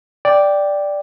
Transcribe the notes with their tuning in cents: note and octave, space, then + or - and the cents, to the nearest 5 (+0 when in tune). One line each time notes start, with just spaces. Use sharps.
D5 +0 G5 +0